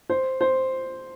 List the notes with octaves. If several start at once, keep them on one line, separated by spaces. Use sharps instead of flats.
C5
C5